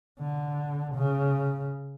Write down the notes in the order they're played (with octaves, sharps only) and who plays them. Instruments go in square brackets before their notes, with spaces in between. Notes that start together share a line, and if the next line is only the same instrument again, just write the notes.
[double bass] D3
C#3